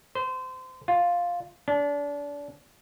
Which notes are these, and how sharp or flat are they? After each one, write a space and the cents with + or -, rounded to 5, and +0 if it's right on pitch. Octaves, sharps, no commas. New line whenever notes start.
C5 -25
F4 +5
D4 -30